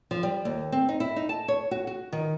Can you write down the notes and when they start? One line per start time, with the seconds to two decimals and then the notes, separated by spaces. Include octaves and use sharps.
0.11 F3
0.23 G3
0.45 D#2
0.72 C4
0.89 D#4
1.00 E4
1.16 D#4
1.29 A5
1.48 C#5
1.71 F#4
1.87 F#4
2.13 D#3